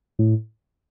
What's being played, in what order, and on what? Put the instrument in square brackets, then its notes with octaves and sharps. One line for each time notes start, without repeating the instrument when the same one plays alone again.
[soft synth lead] A2